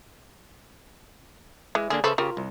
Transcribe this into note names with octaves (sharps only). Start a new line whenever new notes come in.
E3 G#3
D3 A#3 D4 G#4
C#3 A4 B4 C5 E5
C#3 F4 G4 A#4
C2